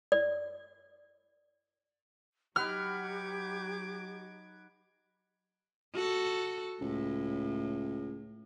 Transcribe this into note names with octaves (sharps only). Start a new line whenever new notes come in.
D5
F#3 D#4 G4 B4 F#5 D6 F6 G#6
F#4 A4
C#2 A2